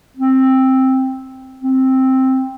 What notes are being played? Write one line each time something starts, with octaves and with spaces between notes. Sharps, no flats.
C4
C4